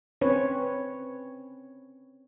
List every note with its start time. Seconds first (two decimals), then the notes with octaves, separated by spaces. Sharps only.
0.21 C4 C#4 B4 C#5